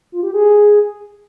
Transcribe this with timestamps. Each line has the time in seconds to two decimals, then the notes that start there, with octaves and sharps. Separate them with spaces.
0.12 F4
0.23 G4
0.34 G#4